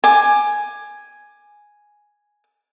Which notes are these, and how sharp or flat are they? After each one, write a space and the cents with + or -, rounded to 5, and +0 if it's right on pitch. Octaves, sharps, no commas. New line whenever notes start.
G#5 +0 D6 +20